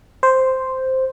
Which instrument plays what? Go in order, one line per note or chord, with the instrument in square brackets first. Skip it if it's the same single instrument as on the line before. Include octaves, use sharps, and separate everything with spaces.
[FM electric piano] C5